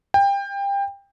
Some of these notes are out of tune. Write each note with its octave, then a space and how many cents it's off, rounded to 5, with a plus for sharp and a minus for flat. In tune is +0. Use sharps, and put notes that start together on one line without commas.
G5 +25